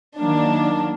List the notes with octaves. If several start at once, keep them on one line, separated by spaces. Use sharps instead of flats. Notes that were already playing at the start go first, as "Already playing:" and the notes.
D#3 F#3 A#3 D4